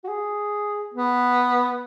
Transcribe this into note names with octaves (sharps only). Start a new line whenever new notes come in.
F#4
G#4
B3